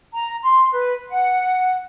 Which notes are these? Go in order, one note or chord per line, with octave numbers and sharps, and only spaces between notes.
A#5
C6
B4
F#5